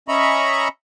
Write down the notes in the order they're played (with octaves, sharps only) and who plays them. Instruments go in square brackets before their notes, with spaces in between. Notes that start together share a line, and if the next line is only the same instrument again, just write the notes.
[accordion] C#4 D#5 E5 A#5 B5 C#6